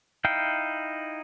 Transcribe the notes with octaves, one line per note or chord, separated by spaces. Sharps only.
D#4 E4 F5 G5